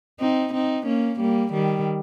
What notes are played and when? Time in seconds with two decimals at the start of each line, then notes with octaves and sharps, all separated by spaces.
0.20 C4 D#4
0.54 C4 D#4
0.87 A#3 C#4
1.20 G3 A#3
1.53 D#3 G3